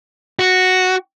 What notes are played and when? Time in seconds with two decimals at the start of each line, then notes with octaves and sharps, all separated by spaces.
0.39 F#4